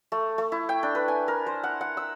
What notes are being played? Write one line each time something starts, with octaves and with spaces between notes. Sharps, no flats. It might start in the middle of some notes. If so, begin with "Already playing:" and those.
A3
A3
E4
G5
D4
B4
G#5
A#4
C5
F#5
F#5
E6